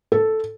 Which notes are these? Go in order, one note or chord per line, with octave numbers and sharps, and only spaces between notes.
A4